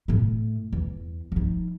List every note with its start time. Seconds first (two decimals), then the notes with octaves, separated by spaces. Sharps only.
0.08 A2 A3
0.72 E2
1.32 F3 D#4